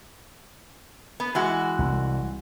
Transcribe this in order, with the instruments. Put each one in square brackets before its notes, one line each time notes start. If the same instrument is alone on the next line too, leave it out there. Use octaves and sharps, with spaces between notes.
[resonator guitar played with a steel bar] B3
E3 G#3 F#4
[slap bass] C2